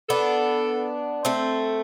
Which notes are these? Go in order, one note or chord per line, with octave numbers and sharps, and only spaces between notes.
B3 D4 A4
A3 C4 A4